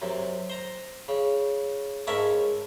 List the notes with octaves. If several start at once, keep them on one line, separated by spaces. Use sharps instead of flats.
F#2 C3
C5 A#5
C#3
G#2 C#3 C#4 A#4 E5 A5